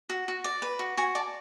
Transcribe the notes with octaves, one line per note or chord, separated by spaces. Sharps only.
F#4
F#4
D5
B4
F#4
F#4 G#5
D5 A5